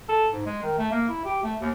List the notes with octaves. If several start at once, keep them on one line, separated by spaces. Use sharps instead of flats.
A4
G#2
G#3
D#3
A3
A#3
E4
G4
A3
D#2